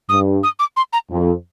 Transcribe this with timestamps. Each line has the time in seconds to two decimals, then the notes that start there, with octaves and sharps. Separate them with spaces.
0.09 G2 D#6
0.43 D#6
0.59 D6
0.77 C6
0.93 A#5
1.10 F2